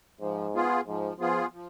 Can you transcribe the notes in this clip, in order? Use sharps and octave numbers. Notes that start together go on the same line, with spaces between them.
G#2 F3
B3 F4 G#4
G#2 F3
F3 B3 F4 G#4
F3